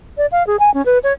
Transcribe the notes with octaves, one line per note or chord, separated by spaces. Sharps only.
D5
F5
G#4
G#5
C#4
B4
C#5